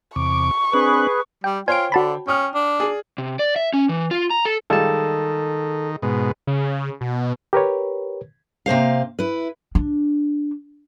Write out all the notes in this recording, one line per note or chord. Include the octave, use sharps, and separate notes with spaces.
E2 C3 C#6 D6
C4 D4 G#4 B4 F#6
G3 G5
F4 C5 C#5 G5 G#5 D7
D3 F#4 A5 B5
C#4 G5 D#6 F6
D4
G#4 D5
C3
D5
E5
C#4
E3
F4
A#5
A4
D#3 G3 G#3 F4 A4 A5
G#2 B2
C#3
B2
G4 A#4 B4 C#5
C3 A#3 C5 F5
E4 B4
D4